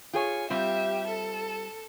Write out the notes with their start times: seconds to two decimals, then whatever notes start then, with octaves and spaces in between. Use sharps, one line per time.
0.13 F4 G#4 C#5 G#5
0.50 G3 C4 F4 G4 E5
1.07 A4